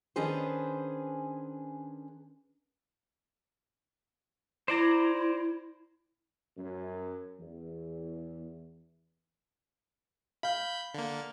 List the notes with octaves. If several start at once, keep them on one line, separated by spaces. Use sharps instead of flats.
D#3 C#4 D4 G#4 B4 C5
E4 C5 D5 A#5
F#2
E2
F5 B5 G6
D3 A#3